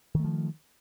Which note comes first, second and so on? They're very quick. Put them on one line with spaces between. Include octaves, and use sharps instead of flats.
D#3 A3 F3